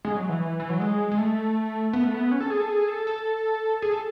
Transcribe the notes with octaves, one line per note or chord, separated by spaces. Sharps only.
G#3
F#3
E3
E3
F#3
G#3
G#3
A3
B3
A3
B3
C#4
A4
G#4
A4
G#4
A4
A4
G#4
A4